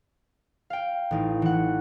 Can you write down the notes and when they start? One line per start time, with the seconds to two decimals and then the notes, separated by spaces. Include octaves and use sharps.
0.70 F5 G5
1.11 A1 D#4
1.42 E3 F#5